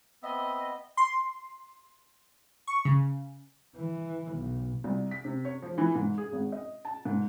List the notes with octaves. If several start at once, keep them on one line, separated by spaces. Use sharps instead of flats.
B3 C4 D#5 E5
C6
C#6
C#3
E3
B1
C2
B6
C3
C#5
F3
E3
G#2
G#4
G#1
D#5
A5
G#2